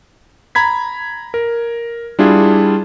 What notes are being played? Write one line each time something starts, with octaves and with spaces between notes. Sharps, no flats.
A#5 B5 G#6 B6
A#4
G3 D4 E4 F4 G#4